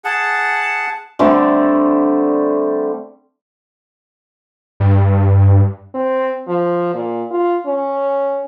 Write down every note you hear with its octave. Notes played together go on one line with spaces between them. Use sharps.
G#4 F#5 A5
D3 G3 A3 C4
G2
C4
F3
A#2
F4
C#4